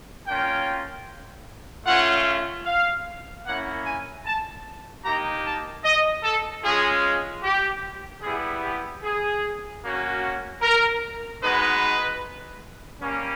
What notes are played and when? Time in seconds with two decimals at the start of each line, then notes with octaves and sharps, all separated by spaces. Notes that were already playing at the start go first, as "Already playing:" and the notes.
0.27 A#3 C#4 F4 G5
1.86 A3 C#4 F4 F#5
2.65 F5
3.45 A#3 C#4 E4 F#5
3.86 G#5
4.25 A5
5.04 A#3 D#4 G4 A#5
5.44 A5
5.85 D#5
6.23 A4
6.64 G#3 C#4 F4 G#4
7.43 G4
8.22 G3 B3 E4 G#4
8.62 G4
9.03 G#4
9.83 A#3 C#4 F#4
10.61 A#4
11.42 G#3 B3 D#4 F#4 B4
13.01 G3 A#3 C#4